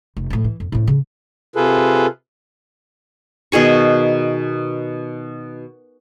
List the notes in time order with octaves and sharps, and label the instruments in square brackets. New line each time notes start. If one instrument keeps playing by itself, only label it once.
[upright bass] F1
A2 F3
E3
F2
A2 C4
C#3
[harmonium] C3 F4 G#4 A4 B4
[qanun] B2 D#3 G#4 C#6